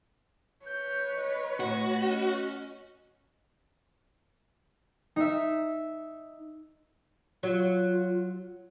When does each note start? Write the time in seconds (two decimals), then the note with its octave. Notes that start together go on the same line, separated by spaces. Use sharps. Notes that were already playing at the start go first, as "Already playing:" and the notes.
0.66 B4 C#5 G6
1.15 D#5
1.60 A2 F#4 D#5
2.02 C#4
5.16 D#4 E5
7.43 F#3 F4